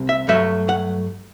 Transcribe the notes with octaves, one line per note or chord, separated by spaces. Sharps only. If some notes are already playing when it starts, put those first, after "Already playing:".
Already playing: C2 C3
E5
G2 F#3 A3 E5
F#5